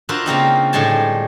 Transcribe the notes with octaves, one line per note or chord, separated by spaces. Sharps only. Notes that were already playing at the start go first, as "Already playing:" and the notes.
D4 F4 F#4 A#4 C5 E5
C#3 A#3 C4 D#4
A2 D3 G3 G#3 G#5 A5